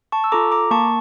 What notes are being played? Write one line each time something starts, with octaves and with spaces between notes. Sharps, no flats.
A5 C#6
E6
F4 A4 A#5 D6
A#5 D6
A#3 A5 C#6